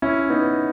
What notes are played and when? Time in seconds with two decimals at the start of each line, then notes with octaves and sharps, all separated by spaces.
0.02 C#4 E4
0.30 B3 D#4